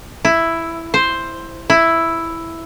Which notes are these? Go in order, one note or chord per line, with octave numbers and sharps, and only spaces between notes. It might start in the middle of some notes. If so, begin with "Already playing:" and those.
E4
C5
E4